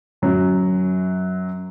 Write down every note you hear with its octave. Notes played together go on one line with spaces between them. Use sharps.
F#2 F#3